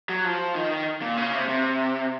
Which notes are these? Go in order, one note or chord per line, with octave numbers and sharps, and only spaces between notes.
F#3
F3
D#3
D#3
A#2
C#3
C3
C3